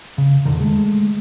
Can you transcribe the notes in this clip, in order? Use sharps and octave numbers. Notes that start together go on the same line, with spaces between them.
C#3
E2 A#2 D3 D#3
G#3 A3